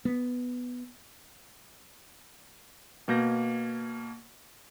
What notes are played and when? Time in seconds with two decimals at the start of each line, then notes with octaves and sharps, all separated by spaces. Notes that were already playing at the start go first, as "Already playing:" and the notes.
0.05 B3
3.08 B2 A#3 G6 A#6